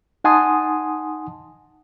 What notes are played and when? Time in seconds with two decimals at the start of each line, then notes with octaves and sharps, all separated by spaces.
0.24 D#4 F#5 G#5 A5 C6 D#6